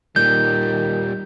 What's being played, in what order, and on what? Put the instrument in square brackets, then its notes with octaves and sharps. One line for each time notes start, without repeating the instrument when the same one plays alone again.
[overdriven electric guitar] A#2 G3 [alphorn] D#3 [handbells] G6